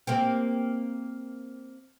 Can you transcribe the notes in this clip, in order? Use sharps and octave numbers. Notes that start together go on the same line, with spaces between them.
A#3 C4 G4